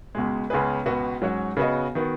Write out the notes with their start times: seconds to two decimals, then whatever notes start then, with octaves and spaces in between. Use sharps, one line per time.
0.15 C#2 B2 G#3
0.50 C#2 C#3 B3 G#4 B4
0.86 C#2 B2 B3 F#4
1.22 G#2 F#3 C#4 F#4 C#5
1.57 C#3 B3 F#4 D#5
1.95 D#3 B3 F#4